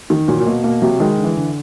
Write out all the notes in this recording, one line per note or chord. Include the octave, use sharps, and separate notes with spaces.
D#3
A#2 F#3
A#2
B2 A#3
B2 A#3
C3 F#3
D#3 G#3
D3
E3
D3